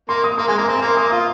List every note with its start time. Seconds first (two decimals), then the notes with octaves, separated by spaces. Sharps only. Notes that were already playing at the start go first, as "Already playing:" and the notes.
0.09 A#3 C6
0.24 D#6
0.38 A#3 C6
0.48 G#3 G#5
0.58 A#3 A#5
0.68 C4 A#5
0.78 G#5
0.82 A#3
0.87 C6
0.97 A#3 D#6
1.12 F4 D#6